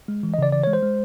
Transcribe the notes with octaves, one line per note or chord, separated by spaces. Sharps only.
G#3
E3
D#5
C#3 D5
E3 D5
G#3 C#5
C5
G#3